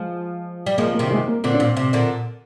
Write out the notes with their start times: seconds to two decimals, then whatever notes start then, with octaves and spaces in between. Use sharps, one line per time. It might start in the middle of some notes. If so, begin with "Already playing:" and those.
Already playing: F3 G#3
0.66 G3
0.78 F3 G#3 A#3
0.94 A#3
0.99 C3 D#3
1.11 G#3
1.28 A#3
1.44 A#2 D3 C4
1.54 D4
1.60 A#2 C4
1.77 C3
1.93 A#2 D3